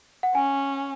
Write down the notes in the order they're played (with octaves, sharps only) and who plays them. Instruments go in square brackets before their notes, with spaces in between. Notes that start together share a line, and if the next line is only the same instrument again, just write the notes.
[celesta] F#5
[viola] C#4 [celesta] G#5